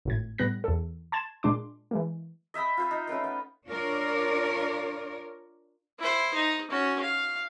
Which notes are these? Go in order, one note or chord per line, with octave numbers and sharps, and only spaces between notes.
G#1 A2 G#6
A2 G3 B3 F#6 A#6
E2 A4
A5 C6 G#6 A6 E7
A#2 G#3 D4 C6 D6
E3 G#3 A#3
D#5 E5 G5 B5
F4 C5 E5
D#4
A3 C#4 B4 G5
B3
D4 F4 A#4 C#5 D5
E4 C5
D#4
C#4 F#4
F5